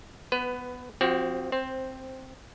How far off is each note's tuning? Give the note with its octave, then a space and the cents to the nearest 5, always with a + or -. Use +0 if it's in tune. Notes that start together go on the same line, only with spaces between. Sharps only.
B3 +0 B4 +20
F3 +25 C4 +0 F#4 +45
C4 +0 C5 +10